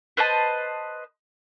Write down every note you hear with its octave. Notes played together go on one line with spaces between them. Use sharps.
B4 C5 D#5 A5